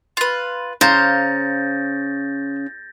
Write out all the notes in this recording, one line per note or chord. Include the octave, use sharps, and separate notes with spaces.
F4 B4
C#3 C5 F5 A#5 G6 A6 A#6